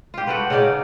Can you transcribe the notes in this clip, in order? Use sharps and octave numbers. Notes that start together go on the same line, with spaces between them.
F4 G4
F#4 A4 B4
C#3 C#4 D#4 D5